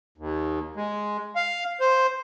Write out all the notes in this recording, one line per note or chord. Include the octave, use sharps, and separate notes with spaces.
D#2
G#3
F5
C5